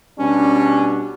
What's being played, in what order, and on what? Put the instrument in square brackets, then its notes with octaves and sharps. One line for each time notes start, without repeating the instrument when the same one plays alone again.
[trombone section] B2 G3 D4 [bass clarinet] C#4